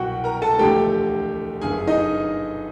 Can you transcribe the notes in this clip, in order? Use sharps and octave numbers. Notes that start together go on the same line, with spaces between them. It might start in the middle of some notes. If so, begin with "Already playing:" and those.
Already playing: C2 B2 F#3 F#4 F#5 G5
A#4 A#5
A4 A5
E1 D2 D3 F3 A3 G4 G5
G1 F#2 D3 G#4 G#5
D#4 D#5